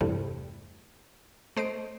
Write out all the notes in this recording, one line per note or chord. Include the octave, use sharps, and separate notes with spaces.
E2 G2 C3 G3 A3
A3 C5 D#5 D7